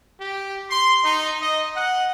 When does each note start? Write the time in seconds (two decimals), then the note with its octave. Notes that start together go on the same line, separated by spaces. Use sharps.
0.20 G4
0.70 C6
1.05 D#4
1.41 D#5
1.76 F#5